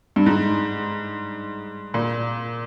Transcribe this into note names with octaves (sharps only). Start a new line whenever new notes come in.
G2
G#2
A#2